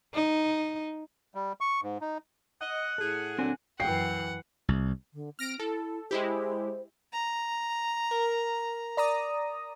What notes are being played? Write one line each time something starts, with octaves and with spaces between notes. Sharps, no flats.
D#4
G3
C#6
G#2
D#4
D#5 F#5
A2 G#4 A4
A#2 D3 F#3 C4 D4 G#5
F#2 E3 F#5 G5 C7
C2
D3
C4 F6 A#6 D7
E4 A4
G#3 E4 G4 C5
A#5
A#4
D5 A#5 D#6